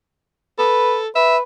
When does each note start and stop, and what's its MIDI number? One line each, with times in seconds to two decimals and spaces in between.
0.59 1.08 69
0.59 0.99 71
1.15 1.41 71
1.15 1.37 76